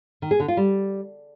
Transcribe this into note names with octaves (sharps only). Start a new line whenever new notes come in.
D#3
G#4
D3
F4
G3